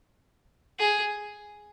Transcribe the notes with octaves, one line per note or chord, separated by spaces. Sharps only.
G#4